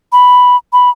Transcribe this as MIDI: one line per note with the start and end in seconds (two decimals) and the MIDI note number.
0.12 0.56 83
0.73 0.90 83